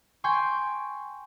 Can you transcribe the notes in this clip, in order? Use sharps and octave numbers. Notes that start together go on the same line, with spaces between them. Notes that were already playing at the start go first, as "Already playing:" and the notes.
G5 G#5 C6 C#6